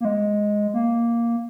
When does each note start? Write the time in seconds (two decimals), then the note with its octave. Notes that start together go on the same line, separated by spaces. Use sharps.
0.01 A#3
0.05 G#3
0.74 A#3